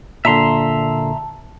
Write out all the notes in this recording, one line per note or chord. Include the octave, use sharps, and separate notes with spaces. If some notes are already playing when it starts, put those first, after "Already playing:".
A#2 D3 E5 A5 A#5 C6